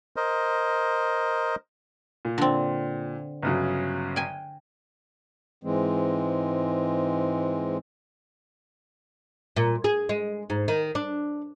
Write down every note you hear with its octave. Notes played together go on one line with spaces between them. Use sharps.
A#4 C5 D#5
A#2
D3 C4
G1 C#3 F#3
G5 G#5
G#2 E3 G#3 C4
A#2
G#4
G#3
G#2
D#3
D4